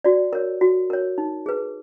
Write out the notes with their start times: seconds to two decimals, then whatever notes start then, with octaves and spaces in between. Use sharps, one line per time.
0.04 F#4 D5
0.33 A#4 C#5
0.61 F#4
0.90 A#4 C#5
1.18 D#4
1.46 G#4 B4